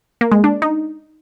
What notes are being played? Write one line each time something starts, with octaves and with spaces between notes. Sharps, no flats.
A#3
G#3
D4
D#4